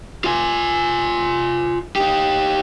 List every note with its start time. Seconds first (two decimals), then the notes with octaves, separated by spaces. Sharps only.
0.24 F4 G#5
1.96 D#4 G4